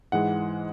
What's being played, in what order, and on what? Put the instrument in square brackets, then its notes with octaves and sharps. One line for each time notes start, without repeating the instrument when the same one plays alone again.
[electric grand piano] G#2 E3 G#3 F#5